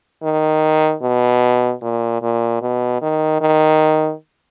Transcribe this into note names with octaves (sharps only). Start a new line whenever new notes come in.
D#3
B2
A#2
A#2
B2
D#3
D#3